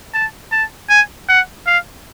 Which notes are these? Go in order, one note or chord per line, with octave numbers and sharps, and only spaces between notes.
A5
A5
G#5
F#5
F5